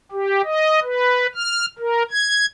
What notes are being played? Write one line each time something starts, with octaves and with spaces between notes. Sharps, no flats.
G4
D#5
B4
F6
A#4
G#6